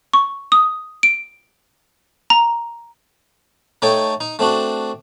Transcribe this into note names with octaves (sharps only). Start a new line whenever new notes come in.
C#6
D#6
D7
A#5
A3 D#4 A4 C#5 G5 C#6
D#4
A3 C4 D4 F#4